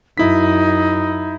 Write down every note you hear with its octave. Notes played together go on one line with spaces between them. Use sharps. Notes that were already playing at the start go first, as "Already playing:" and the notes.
F#2 D#4 E4 B6